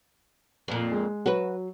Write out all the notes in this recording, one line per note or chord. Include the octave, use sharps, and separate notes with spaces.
F2 A#2
G#3
F#3 F#4 B4